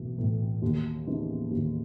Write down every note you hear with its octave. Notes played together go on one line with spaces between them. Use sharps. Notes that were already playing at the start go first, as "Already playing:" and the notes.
Already playing: B1 A2 E3
A2 E3
D#2
C#3 E3 B3 D#4
D#2